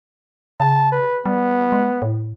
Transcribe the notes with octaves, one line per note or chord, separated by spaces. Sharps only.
C#3 A5
B4
G3 B3
G#3
A2